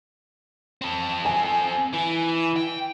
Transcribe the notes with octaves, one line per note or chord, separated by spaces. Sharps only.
C4 A4
G#5
E3
G5